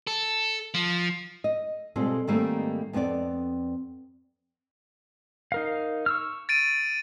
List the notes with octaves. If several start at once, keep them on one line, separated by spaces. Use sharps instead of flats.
A4
F3
D#5
B2 G3 G#3 C4 F4 A4
G#2 D#3 G3 A3 A#3 C4
F2 B3 C4 G4 D5
D#4 A#4 F5
C#6 E6 F6
A6 D7 D#7